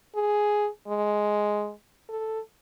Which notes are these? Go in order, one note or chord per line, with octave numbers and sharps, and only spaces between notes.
G#4
G#3
A4